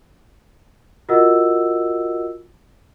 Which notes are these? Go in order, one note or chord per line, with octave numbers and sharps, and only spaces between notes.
F4 F#4 A#4 D#5 F#5 E6